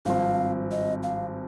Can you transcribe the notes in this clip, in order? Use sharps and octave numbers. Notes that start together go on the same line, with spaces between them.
G#1 G2 F3 C4 F5
D#5
F5